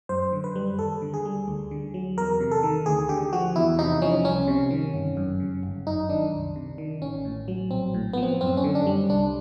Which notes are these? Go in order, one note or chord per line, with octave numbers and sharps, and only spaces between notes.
F#2 C5
D3
B4
G3
D#2 A4
D3
G#4
G3
D2
D3
F#3
E2 A#4
C3
A4
D#3
D2 G#4
D3 G4
F3 F#4
E2 E4
C3 D#4
F3 C#4
C2 C#4
C3
D#3
G1
F#2
C#3
G1
F#2 D#4
D#3 D4
C2
C3
D#3
A1 C#4
A2
F#3
A#1 C4
A2
F3 B3
C4
F#2 C4
C#4
D3
D4
G3
C2 D4